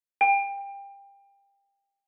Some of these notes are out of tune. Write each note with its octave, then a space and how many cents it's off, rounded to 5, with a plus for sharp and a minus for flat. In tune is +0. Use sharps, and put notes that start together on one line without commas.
G5 +25